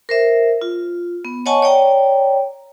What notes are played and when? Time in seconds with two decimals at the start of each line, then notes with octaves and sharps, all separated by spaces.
0.09 A#4 C5 E5
0.61 F4
1.25 B3
1.46 C#5 D#5 F#5 G#5 A5 C#6
1.62 C#5 D5 G5 A#5